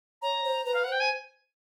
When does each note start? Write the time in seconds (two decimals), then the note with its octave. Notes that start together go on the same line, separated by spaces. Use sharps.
0.22 C#5 A#5
0.44 C5
0.65 B4 A#5
0.74 F5
0.84 C5 F#5
0.92 G5
1.00 G#5